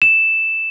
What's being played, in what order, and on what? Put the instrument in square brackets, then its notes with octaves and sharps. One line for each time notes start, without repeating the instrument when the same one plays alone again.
[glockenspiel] E7